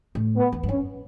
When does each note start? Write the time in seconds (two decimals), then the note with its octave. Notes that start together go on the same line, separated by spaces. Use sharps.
0.15 A2
0.36 B3
0.52 E2
0.63 G2
0.69 F#2 C#4